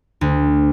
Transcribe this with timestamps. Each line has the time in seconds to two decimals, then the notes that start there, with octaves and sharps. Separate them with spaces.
0.21 D2